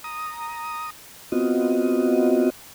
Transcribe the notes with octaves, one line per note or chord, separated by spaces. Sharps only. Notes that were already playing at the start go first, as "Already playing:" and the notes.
A#5 D#6
B3 C4 F4 F#4 D#5